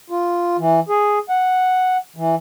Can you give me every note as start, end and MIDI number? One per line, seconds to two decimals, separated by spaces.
0.10 0.57 65
0.59 0.80 52
0.89 1.19 68
1.29 1.97 78
2.16 2.35 52